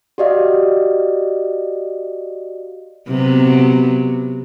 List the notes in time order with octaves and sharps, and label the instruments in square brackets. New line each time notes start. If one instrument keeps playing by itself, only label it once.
[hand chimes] F#4 G4 D5 D#5 F5
[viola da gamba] C3 F#3 B3